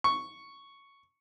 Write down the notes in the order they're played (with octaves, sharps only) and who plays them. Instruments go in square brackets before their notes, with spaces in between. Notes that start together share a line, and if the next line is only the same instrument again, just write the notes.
[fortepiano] C#6